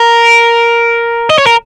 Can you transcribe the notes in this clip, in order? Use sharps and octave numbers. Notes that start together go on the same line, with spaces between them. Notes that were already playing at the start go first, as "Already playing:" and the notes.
Already playing: A#4
D#5
C#5
A#4